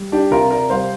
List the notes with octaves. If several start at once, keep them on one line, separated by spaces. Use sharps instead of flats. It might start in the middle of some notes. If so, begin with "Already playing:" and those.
Already playing: G3
D4 G4
C3 F4 A#4
A#4 D5
G3 C5 F5